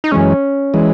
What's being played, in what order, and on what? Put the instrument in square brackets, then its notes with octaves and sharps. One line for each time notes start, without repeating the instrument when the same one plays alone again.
[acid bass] D#4
[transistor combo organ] F#2 E3 G#3 [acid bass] C#4
[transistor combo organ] E3 G#3